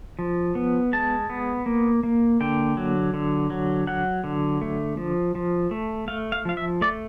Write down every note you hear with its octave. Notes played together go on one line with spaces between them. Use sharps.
F3
B3
G#3 A5
B3
A#3
A#3
D3 G5
F#3
D3
F#3
F#3 F#5
D3
A3
F3
F3
A3
A3 F5
F5
F3 F5
E5
A3 D5